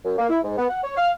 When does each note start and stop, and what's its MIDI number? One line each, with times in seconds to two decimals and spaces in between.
0.05 0.15 42
0.18 0.25 58
0.30 0.38 64
0.44 0.54 44
0.58 0.65 59
0.70 0.80 78
0.83 0.94 73
0.97 1.11 77